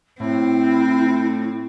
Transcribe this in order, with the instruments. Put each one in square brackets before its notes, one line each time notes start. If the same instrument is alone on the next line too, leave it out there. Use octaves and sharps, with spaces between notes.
[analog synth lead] A2 [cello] C4 [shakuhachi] E4